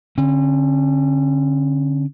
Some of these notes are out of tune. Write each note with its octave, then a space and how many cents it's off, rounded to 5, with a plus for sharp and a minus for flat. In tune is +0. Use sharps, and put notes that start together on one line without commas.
D3 -15 C#4 -40